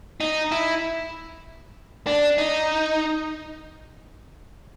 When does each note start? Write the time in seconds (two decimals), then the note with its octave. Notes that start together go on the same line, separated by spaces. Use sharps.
0.20 D#4
0.52 E4
2.07 D4
2.38 D#4